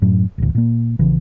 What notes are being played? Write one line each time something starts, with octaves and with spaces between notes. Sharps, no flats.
F#2 A2 F#3
D#1 A1 D2
A#2 A#3
A#1 C#3 E3